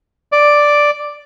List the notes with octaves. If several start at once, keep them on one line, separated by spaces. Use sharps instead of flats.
D5